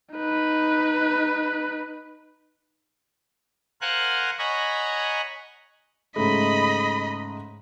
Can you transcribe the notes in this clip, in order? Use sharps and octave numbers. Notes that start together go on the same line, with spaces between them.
D#4 B4
A#4 C5 F5 F#5 G#5 F#6
C#5 D#5 F#5 G#5 A#5 B5
G#2 C#3 A3 D#5 B5